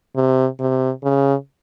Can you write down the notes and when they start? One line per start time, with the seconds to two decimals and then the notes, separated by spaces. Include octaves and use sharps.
0.16 C3
0.60 C3
1.03 C#3